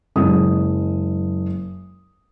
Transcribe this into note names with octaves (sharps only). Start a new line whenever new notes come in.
F#1 G#3 D#6